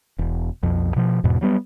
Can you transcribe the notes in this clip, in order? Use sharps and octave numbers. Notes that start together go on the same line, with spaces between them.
E1
B1 F2
B2 F3
E2 G#2 B2
F#3 G3 B3